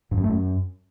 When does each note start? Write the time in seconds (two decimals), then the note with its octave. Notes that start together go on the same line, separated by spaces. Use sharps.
0.11 G2
0.17 F#2
0.23 A3
0.29 F#2